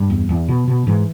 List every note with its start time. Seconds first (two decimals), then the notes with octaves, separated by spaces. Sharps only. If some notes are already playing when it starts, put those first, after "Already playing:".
Already playing: G2
0.10 E2
0.29 E2
0.48 B2
0.67 B2
0.87 G#2 E3